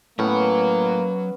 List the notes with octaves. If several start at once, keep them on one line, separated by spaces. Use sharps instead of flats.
A2 F#3 A#3 B3 C#4 F#5